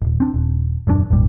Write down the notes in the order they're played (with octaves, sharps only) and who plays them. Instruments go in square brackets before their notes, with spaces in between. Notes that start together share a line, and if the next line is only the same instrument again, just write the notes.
[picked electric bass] D#1 G#1
C4 D4
D#1
D#1 F#2 F3 D4
G#1 E2 A#2 G3